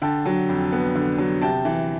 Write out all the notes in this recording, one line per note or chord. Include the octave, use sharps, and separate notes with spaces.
D3 G5 A5
F#3
F2
B3
D3
F#3
C3 G5 A5
E3